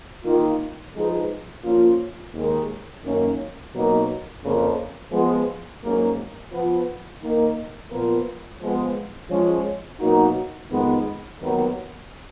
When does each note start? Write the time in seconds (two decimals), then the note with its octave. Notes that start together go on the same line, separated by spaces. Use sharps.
0.25 D#3 A#3 F4
0.94 F3 G#3 D#4 G#4 B4
1.64 F3 A#3 C#4 F4
2.33 D#2 D#3 G#3
3.03 F#2 D#3 A#3 C#4
3.73 B2 F#3 A#3 D#4
4.42 F2 C#3 F3 A#3
5.12 F3 G#3 B3
5.82 G#2 F#3 A#3 C#4
6.51 F3 B3 F4
7.22 D#3 A#3 D#4
7.91 A#2 F3 B3 F4 A#4
8.60 F3 G#3 B3
9.30 F3 G#3 C#4
10.00 B2 F#3 A#3 D#4 F#4
10.69 F2 D#3 G#3 B3
11.39 D#2 D#3 F#3 B3